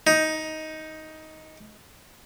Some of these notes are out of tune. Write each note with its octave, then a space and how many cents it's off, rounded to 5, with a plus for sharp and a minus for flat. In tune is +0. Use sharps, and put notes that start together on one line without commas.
D#4 +10